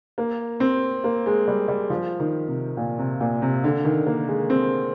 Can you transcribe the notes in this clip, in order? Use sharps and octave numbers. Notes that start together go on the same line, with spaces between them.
A#3
C4
A#3
G#3
G3
G3
F3
D#3
C3
A#2
C3
A#2
C3
D3
D#3
A#3
G#3
C4